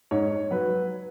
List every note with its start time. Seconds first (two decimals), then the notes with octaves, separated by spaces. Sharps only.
0.11 G#2 C#5
0.51 F#3 B4